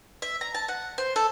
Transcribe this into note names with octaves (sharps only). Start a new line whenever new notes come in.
E5
A#5
A5
F#5
C5
A4